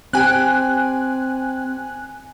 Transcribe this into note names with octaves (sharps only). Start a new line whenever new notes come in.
C4 G4 G5 G#5 F#6